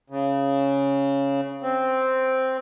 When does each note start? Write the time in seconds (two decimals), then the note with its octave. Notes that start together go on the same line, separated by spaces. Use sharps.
0.10 C#3
1.62 C4